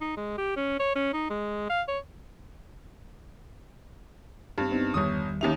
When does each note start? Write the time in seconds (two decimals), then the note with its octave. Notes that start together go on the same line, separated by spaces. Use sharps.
0.01 D#4
0.17 G#3
0.38 G4
0.56 C#4
0.80 C#5
0.96 C#4
1.14 D#4
1.30 G#3
1.70 F5
1.88 C#5
4.58 G2 C4 D4
4.70 B3 C4 D#4
4.94 G1 E2 D#3 G3 C#5 D#6
5.41 D#2 C#4 D#4 G4 E5 F7